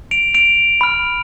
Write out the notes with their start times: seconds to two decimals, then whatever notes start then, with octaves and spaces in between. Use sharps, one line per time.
0.11 D7 F7
0.34 D7 F7
0.81 B5 F6